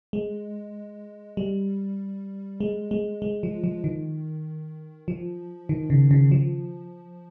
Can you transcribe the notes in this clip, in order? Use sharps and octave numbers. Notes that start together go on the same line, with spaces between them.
G#3
G3
G#3
G#3
G#3
F3
F3
D#3
F3
D#3
C#3
C#3
F3